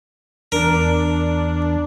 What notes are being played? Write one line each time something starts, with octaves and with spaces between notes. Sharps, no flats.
E2 D4 A#4